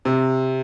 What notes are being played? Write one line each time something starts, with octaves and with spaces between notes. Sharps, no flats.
C3